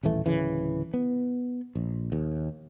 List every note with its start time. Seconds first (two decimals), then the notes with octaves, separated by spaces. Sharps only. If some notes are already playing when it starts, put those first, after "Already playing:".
0.03 D#1 A1 E3 A3
0.26 D1 C#3 E3
0.94 B3
1.75 A#1
2.12 D#2